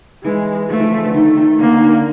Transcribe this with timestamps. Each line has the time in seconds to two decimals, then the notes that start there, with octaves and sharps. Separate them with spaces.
0.24 E3 G#3
0.69 F3 A3
0.80 E3
0.91 F3
1.05 D3
1.14 D#3 A3
1.37 D#3
1.60 D3 A#3
1.77 D#3
1.82 D3